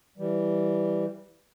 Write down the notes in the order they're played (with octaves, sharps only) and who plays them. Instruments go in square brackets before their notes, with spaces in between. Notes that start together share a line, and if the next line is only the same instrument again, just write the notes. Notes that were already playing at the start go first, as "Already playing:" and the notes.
[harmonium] E3 G3